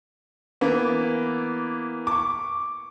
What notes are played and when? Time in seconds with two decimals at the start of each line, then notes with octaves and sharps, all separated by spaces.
0.61 E3 A#3 B3
2.07 C#6 D6